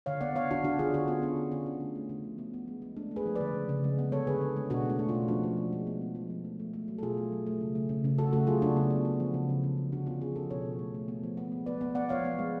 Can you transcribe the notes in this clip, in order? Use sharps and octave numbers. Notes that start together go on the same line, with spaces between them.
D3 C#5 F5
B3 D5 F#5
D3 C#5 F5
D3 D4 F#4
D3 D4 F#4
D3 F4 G#4
D3 D4 F#4
B3 C#4 F4
D3 D4
B3
D3 C#4
D3
A3
A3
D3
F3
B3
B3
G#3
G#3
A3 D4
A3
G#4 B4
F3
D3 B4 D5
C#3
C#3
G#3
B3
D3 A4 C#5
D3 G#4 B4
D3
G#3
B2 D4 F#4
A3 D4
A3
C#4 F4
B2
F3 D4 F#4
F3
F3
G#3
B3
B3
F3
F3
A3
A3
A3
F#3
A4
B2 F4 G#4
A3
F#3
A3
C#3
A3
C#3
C#3
C#3 F#4 A4
A3 F#4 A4
F#3 F4 G#4
C#3 D4 F#4
B3
B3
B3
F3
C#3
C#3
C#3
F3
D3 D4 F#4
B3 C#4 F4
F3 F4 G#4
F3 F#4 A4
B2 A4 C#5
B2
A3
A3
B3
F3
B3
G#3
B3 B4 D5
B3
B3 D5 F#5
F3 C#5 F5
B3
G#3